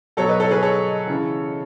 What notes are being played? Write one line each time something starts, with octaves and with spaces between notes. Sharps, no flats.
B2 F#3 A4 C#5
B4 D#5
A4 C#5
G#4 B4
A4 C#5
C#3 E3